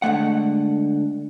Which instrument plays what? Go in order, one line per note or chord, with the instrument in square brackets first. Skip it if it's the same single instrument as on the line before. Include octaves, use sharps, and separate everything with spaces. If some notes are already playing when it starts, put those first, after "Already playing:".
[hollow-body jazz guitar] D3 G#3 A3 F#5